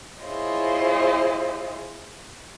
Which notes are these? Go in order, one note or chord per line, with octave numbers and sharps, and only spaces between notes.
E4 F4 G#4 C5 C#5 D#5